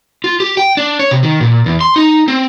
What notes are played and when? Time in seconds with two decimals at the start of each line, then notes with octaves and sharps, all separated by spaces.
0.24 F4
0.40 G4
0.57 G5
0.77 D4
1.00 C#5
1.11 C3
1.23 D#3
1.41 A#2
1.66 E2
1.81 C6
1.96 D#4
2.28 C4